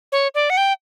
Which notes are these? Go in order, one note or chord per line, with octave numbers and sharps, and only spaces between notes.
C#5
D5
F#5
G5